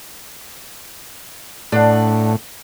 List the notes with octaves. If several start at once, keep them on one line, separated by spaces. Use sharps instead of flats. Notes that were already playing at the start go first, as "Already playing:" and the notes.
A2 D4 F#5